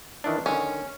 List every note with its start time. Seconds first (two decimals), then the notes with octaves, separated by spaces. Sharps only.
0.24 D#3 E3 D4
0.46 D3 D#3 C#4